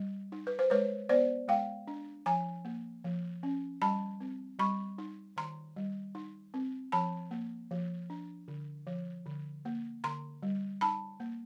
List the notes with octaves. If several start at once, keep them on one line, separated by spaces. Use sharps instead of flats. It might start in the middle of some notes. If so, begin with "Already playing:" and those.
Already playing: G3
D#4
B4
C5
G#3 B4 C#5
B3 C5 D5
G#3 F5 G5
D4
F3 G#5 A#5
A#3
F3
C#4
G3 A5 B5
C4
G3 B5 C#6
D#4
D#3 A#5 C6
G3
D#4
C4
F3 A5 B5
A#3
F3
D4
D3
F3
D3
A#3
D3 A#5 C6
G3
D#4 A5 B5
A#3